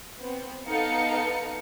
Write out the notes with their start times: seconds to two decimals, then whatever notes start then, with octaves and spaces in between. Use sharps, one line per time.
0.20 B3 C4
0.67 B3 D#4 A4 F5 C#7